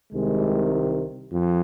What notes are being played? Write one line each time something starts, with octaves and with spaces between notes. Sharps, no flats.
C2 C3 D#3 G#3
F2